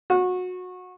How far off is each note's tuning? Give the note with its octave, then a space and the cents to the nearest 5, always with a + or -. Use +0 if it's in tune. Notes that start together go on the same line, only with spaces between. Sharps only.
F#4 -25